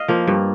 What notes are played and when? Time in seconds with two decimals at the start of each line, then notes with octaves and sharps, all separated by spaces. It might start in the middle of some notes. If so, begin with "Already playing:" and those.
Already playing: D#5 F5
0.08 F3 A#3
0.27 G2